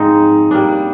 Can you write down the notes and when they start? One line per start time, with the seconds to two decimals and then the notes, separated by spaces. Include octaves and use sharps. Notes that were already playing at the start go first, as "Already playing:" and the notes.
Already playing: G#2 F3 G#3 C4 D#4
0.51 G3 A#3 D4